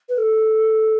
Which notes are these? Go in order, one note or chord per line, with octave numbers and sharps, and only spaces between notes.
B4
A4